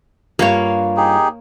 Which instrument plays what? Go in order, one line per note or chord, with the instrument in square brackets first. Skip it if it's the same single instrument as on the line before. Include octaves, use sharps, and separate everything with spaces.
[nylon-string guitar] G2 F4 F5 [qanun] A#3 C#5
[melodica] D#4 G4 G#4